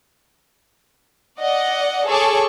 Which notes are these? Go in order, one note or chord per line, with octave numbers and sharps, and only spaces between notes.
D5 D#5 F#5
G#4 A4 C#5 C#6 D6